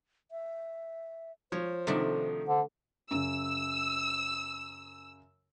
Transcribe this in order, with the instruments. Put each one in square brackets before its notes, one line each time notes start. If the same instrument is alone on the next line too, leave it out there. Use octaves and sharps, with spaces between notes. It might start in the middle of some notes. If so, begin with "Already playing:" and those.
[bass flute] E5
[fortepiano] F3 [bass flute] C5 [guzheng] C#5
[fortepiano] C3 D#3 F3 [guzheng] A3 D4 F#4
[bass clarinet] D3 [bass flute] C5
[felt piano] F#2 C#3 [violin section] E6